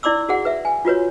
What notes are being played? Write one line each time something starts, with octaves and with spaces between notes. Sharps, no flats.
E4 D5 C6 D6 E6
F#4 G#4 F#5
B4 E5
G#5
F4 F#4 B4 C#5